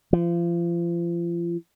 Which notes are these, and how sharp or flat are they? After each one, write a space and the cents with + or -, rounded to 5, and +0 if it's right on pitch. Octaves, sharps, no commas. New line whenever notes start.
F3 -35